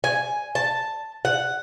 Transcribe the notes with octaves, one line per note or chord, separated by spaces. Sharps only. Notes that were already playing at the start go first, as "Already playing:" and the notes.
G#5
A5
F#5